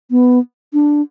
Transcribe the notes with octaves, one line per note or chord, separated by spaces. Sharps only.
B3
D4